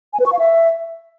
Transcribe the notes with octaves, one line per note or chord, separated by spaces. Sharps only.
G#5
B4
C#6
F5
E5